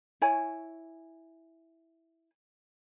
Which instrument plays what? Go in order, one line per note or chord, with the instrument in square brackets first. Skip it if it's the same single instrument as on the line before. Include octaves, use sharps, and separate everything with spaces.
[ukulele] E4 C#5 G#5